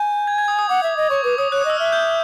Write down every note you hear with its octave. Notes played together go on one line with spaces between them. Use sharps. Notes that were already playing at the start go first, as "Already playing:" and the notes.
Already playing: G#5 G6
G#6
G#6
D#6
D#6
F#5 D6
E5
D#5
C#5 C#6
B4 D6
C#5 D#6
C#5 F#6
D#6
D#5 E6
E5 F6
F#6
G6